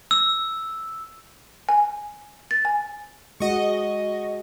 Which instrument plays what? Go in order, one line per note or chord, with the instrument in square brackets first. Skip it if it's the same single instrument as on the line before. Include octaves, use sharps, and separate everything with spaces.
[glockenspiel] E6
[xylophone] G#5
A6
G#5
[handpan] G#3 F#4 [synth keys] D#5 C#6